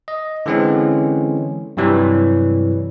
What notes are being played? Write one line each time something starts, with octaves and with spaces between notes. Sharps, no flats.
D#5
D3 E3 G#3 C4 C#4
G2 C3 E3 F#3 G3